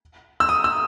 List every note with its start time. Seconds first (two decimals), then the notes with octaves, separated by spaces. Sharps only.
0.40 E6
0.49 D#6
0.64 E6